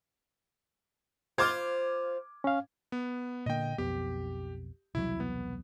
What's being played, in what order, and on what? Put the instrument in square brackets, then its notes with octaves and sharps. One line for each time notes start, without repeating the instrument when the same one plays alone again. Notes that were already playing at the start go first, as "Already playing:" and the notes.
[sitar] F4 C5 [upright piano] D6 F6 G#6
[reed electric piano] C#4 F5
[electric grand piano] B3
[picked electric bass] A#2 D3 A#3 [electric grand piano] D#5 G5
[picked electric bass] B1 F2 B3 [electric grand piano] G4
[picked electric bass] E1 C2 F#3 [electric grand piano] E4
[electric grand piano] B3